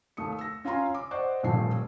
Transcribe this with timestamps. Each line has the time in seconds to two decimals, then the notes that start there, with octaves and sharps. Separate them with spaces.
0.17 D#2 A3 D#6 C#7
0.39 E6 A#6
0.65 C#4 F4 F5 G#5 A#5 C6
0.94 D6
1.11 C5 D5 D#5 F#5 C#6
1.43 D#1 A#1 F2 A3 C7